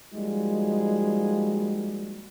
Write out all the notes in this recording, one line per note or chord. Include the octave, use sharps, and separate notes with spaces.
F3 G3 G#3 A#3 D#4 F#4